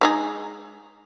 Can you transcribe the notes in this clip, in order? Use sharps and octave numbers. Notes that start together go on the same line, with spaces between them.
G#3 D#4 G#4